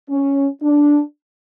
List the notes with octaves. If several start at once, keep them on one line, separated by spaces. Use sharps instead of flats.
C#4
D4